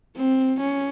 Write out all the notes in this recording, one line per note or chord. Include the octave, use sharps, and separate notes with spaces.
C4
C#4